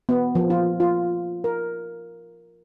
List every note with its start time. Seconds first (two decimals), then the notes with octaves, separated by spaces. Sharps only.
0.09 B3
0.35 F3
0.50 F4
0.80 F4
1.44 A#4